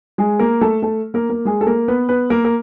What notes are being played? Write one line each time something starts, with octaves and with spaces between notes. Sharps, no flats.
G#3 G#4
A#3 A#4
A3 A4
A3 A4
A#3 A#4
A#3 A#4
G#3 G#4
A4
A#3 A#4
B3 B4
B3 B4
A#3 A#4
A#4